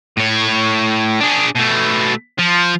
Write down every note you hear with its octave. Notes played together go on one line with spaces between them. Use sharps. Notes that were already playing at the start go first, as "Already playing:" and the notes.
A2 C#5
D4 G#4
B2 A3
F3